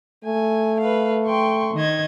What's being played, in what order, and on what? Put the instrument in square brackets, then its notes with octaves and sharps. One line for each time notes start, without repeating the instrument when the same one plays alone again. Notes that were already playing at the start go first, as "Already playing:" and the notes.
[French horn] A3 [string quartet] G#5
[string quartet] B4 F5
G5 C6 C#6
D#3 D#5 G#6